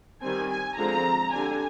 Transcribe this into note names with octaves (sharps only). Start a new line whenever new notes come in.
D#3 G3 C4 G#5
G#5
D3 F3 G#3 C4 A#5
D3 G3 D4 G#5